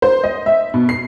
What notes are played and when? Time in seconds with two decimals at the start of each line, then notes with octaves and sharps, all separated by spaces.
0.02 C5
0.24 D#5
0.46 E5
0.74 B2
0.89 C7